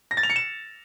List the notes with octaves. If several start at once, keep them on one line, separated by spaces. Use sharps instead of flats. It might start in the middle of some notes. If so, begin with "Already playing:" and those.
A#6
A6
F7
C#7
E7